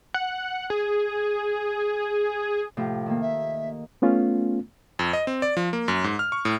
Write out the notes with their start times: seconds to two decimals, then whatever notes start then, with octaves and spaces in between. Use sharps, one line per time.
0.14 F#5
0.70 G#4
2.77 A2 C3 F3
3.06 D#3 A#3
3.21 E5
4.02 A3 B3 C#4 F4
4.99 F2
5.13 D#5
5.27 C4
5.42 D5
5.57 F3
5.73 A#3
5.88 F#2
6.04 G#2
6.19 F6
6.32 C#6
6.45 A2